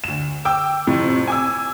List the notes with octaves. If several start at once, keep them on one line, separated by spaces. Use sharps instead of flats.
D2 E7
G5 D6 E6
F2 A2 C3
G#5 D6 E6